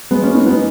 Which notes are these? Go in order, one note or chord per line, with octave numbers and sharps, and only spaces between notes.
G#3 B3
A#3 C#4
B3 D#4
B3 D#4